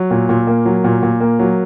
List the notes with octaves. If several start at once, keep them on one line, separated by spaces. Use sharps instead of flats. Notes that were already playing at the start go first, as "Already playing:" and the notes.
Already playing: F#3
A#2
A#2
A#3
F#3
A#2
A#2
A#3
F#3